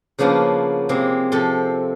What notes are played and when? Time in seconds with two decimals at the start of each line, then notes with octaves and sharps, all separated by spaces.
0.19 C#3 F3 A#3 B3 D4
0.89 C3 G#3 A#3 C4 G#4
1.32 C3 F3 A4 C6